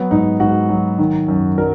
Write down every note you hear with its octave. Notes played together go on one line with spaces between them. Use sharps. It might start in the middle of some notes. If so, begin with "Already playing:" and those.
Already playing: F#3 B3
G#2 D#4
G#2 F#4
F#3
D#3
F#2
F#3 A#4